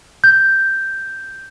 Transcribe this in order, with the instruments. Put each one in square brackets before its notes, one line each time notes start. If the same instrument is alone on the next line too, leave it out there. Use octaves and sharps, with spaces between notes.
[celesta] G6